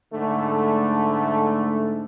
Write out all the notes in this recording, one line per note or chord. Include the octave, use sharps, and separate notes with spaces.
G#2 D3 A3